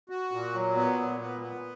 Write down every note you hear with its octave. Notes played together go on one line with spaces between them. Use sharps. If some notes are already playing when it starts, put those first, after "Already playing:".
F#4
A#2
F#3
B3
A#2
B3
B3